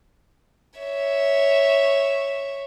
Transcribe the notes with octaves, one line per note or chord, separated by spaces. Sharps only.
C#5 E5